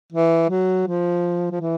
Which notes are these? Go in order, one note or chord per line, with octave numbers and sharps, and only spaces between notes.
E3
F#3
F3
F3
E3